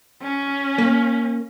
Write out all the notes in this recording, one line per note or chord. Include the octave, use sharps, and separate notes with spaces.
C#4
A#3